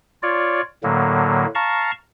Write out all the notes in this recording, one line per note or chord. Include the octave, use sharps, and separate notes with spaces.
F4 C#5 D5
A2 D3 F#3 A#3
F5 A5 A#5 C#6